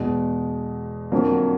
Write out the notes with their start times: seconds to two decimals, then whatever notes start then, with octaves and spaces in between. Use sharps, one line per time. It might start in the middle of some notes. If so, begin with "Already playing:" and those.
Already playing: E2 B2 G#3
1.12 F2 D3 F#3 A#3